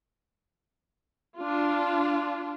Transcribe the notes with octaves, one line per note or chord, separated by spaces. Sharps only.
D4 F4